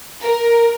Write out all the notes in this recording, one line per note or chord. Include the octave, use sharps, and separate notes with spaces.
A#4